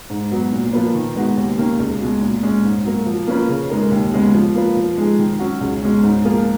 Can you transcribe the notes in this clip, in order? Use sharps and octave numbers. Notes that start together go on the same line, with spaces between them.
G#2
F#3 B3
A#2
F3 A#3 F4 B4
D#3
G#3 B3 D#4 F#4
D#2
D#3 A#3 C#4
C#2
B2 G#3
A#2
G#3 C#4
G#2
F#3 A#3
F3
A#3 C#4 F4 B4
C#3
G#3 D#4 A#4
D#2
C#3 G#3 B3
F3
A#3 F4 B4
F3
G#3 D#4 G#4
D#3
F#3 C#4 F#4
C#2
B2 G#3 C#4
G#2
F3 A#3 F4 G#4